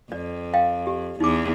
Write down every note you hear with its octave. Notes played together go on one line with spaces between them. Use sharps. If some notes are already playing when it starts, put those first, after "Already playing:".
F2 D5
D#5 F5 G5
G4
E2 D#4 D6